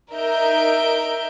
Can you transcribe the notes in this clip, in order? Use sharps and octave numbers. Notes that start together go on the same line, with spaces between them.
D#4 A#4 E5 G6 D7